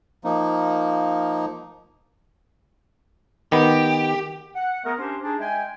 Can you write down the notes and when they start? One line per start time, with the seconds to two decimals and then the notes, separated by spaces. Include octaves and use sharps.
0.24 F3 A#3 D#4
3.52 D#3 B3 G4
4.55 F#5
4.84 A3 B3 G#4 A#4
4.98 C#4 D4 G4 C5
5.23 D4 D#4 G#4
5.39 G#3 E5 G5 G#5